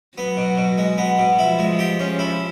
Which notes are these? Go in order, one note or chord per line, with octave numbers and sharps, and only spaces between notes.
F#3 B3
B2
B2
G#3
B3
B2
F3 E4
G#3
G4
C#4
E4